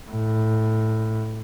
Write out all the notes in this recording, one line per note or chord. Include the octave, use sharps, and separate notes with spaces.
A2